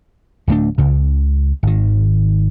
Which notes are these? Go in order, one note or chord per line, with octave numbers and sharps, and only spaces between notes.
D1 G2 A3 D4
C#2 C#3
G#1 D#3